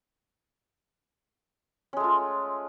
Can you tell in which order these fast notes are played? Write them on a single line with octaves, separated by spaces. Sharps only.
C#4 G#3 A3 F4